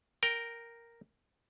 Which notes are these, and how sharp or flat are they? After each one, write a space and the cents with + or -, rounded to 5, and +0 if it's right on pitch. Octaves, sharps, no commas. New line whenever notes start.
A#4 +0 G5 +0